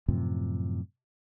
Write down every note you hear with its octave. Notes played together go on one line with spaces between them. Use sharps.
F#2 A2 C3 F3